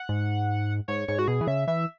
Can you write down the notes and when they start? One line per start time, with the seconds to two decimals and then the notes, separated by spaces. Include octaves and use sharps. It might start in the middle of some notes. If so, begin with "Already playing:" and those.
Already playing: F#5
0.09 G#2
0.88 G#2 C#5
1.08 G#2 C#5
1.19 F#4
1.28 B2 G#4
1.41 E3
1.47 C#3 E5
1.67 E3 E5